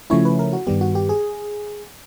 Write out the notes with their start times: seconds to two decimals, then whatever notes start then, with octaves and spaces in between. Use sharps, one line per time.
0.10 C#3 F3 A3 C#4 E4 C#5
0.25 B4
0.39 A#4
0.53 F#4
0.67 G2 D#3 G3 B3 G4
0.81 F#4
0.95 G4
1.09 G#4